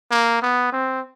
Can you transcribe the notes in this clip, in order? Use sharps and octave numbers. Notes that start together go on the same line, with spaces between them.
A#3
B3
C4